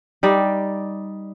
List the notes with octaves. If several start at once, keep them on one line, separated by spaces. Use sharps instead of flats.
G3 D#4 D5